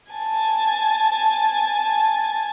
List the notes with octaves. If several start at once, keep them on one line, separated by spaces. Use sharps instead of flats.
G#5 A5